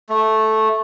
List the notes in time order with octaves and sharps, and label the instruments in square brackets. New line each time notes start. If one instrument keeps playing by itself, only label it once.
[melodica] A3